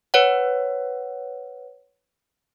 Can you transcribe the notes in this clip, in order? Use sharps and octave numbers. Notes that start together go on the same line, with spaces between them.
B4 C#5 F#5